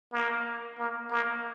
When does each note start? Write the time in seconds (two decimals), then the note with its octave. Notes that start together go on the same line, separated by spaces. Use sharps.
0.12 A#3
0.79 A#3
1.11 A#3